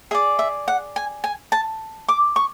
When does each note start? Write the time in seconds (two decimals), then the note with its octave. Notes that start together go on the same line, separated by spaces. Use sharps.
0.11 G#4 E5
0.15 D5
0.39 E5
0.68 F#5
0.96 G#5
1.24 G#5
1.52 A5
2.08 D6
2.36 C#6